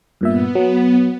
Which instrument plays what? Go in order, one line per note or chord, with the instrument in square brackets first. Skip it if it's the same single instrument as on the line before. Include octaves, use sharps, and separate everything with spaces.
[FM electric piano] G2 A#2 E5 [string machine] B3
[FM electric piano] F#3